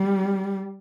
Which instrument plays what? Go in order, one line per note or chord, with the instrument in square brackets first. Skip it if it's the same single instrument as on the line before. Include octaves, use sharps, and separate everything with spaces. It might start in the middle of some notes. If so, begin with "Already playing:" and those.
Already playing: [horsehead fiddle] G3